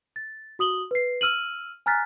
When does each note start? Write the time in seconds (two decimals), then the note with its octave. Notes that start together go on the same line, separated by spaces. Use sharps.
0.16 A6
0.59 F#4 D#6 F#7 G7
0.91 B4 C7
1.21 E6 F6 D#7 F#7
1.86 G#5 A#5 F6 F#6 A6 B6